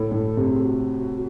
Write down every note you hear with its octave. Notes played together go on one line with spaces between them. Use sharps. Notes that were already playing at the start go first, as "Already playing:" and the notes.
Already playing: A2 A4
A2
C3
G#4
F#4